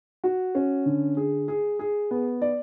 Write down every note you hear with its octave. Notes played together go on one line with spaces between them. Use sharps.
F#4
C#4
D3
G#4
G#4
G#4
B3
D5